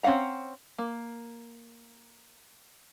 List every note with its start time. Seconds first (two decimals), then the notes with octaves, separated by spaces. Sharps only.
0.03 C4 C#4 F5 F#5 A#5
0.78 A#3